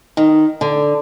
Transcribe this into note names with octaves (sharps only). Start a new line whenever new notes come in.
D#3
D3